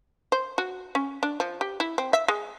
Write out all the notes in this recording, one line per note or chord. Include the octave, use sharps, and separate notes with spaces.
C5
F#4
C#4
D4
F3
G4
E4
C4
E5
G#3